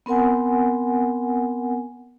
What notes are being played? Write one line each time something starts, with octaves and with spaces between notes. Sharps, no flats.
B3 C4 A#4 F#5 G#5